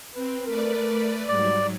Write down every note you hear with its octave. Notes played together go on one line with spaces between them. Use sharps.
C4 B4
A3 A#4 B4 D5
G#2 F#3 G3 D5